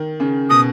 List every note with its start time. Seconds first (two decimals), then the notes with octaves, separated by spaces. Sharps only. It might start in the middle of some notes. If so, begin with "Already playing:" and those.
Already playing: D#3
0.20 C#3
0.50 B2 D#6